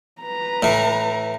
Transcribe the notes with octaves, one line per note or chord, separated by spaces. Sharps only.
B4 A#5
A2 E3